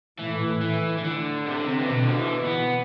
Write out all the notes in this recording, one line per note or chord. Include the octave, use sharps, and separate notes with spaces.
A2 E3
E3
E3
D3
C3
D3
C3
E3
B2 D3
F3
E3
B3